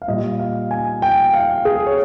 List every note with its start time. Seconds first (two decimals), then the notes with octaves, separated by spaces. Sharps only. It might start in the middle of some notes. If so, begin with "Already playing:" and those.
0.02 F5
0.08 A#2 G3 D#5
0.39 F5
0.71 G#5
1.02 G5
1.33 F5
1.65 G#4
1.87 C#5